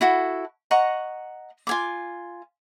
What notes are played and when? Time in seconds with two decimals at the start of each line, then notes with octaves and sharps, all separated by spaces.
0.01 E4 F#4 A4
0.71 D#5 F#5 A#5 C#6
1.67 F4 G#5 D6